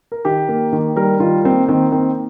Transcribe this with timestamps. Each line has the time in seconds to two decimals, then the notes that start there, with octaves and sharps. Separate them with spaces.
0.12 A#4
0.25 D#3 G4
0.49 A#3
0.73 D#3
0.96 G3 A#4
1.20 D#3 F4
1.44 A#3 C4
1.69 D#3 C4
1.92 A#3 C4